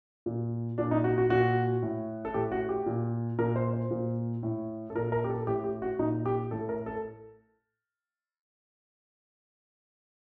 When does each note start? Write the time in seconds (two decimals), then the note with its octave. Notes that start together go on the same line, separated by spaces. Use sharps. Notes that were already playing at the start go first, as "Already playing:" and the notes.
0.26 A#2
0.78 A#2 D4
0.91 D#4
1.04 F#4
1.18 F#4
1.30 A#2 F#4
1.82 A2
2.25 A4
2.34 A2 G4
2.52 F#4
2.69 G4
2.86 A#2
3.39 A#2 A#4
3.56 C5
3.73 C5
3.91 A#2
4.43 A2
4.90 A4
4.95 A#2 A#4
5.12 A#4
5.24 G4
5.30 A4
5.47 A2 G4
5.64 G4
5.82 F#4
5.99 A#2 D#4
6.26 G4
6.51 A2 A4
6.69 A#4
6.86 A4